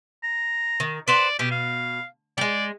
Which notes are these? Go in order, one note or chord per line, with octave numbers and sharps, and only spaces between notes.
A#5
D#3
B4 C5 D5 F#5
B2 G4
F5
G3 G#3 D5